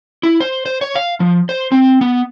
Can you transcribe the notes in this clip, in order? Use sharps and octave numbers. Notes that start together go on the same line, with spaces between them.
E4
C5
C5
C#5
F5
F3
C5
C4
B3